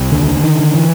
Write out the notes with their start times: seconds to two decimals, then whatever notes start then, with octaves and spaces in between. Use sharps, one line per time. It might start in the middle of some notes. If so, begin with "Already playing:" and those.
Already playing: C2
0.12 D#2 D3
0.36 D3
0.44 D#3
0.59 D3
0.75 E3